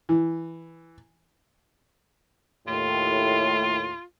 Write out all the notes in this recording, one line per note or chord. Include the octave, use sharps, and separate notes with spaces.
E3
D#2 A2 F4